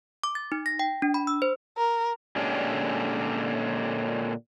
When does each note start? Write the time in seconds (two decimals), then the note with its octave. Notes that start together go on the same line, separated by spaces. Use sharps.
0.24 D6
0.35 A6
0.52 D#4
0.66 A#6
0.79 G5
1.02 D4
1.14 B5
1.27 E6
1.42 C5
1.78 A#4
2.36 A#2 D3 G#3 C#4 D4 G4